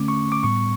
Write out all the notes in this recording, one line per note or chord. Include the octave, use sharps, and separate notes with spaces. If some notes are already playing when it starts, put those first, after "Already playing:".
Already playing: D3 A3 C#4 D6
C#6
D6
A2 G3 B3 C#6